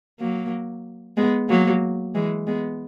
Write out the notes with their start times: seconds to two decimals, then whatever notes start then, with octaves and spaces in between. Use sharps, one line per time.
0.19 F#3 A#3
1.17 G#3 B3
1.49 F#3 A#3
2.15 E3 G#3
2.47 G#3 B3